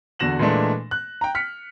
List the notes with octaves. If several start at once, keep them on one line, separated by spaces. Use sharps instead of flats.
E2 D3 F#4 A#6 E7 F#7
A#2 E3 G#3 A3 D4
F#6
G5 A#5
F6 B6 C#7